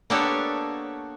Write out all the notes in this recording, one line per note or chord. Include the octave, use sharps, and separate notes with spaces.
A#3 B3 D4 G4 A4 C#5